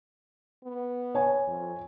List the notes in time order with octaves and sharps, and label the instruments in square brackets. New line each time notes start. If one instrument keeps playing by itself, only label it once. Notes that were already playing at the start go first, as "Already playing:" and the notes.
[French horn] B3
[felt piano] C#5 G#5
[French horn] F2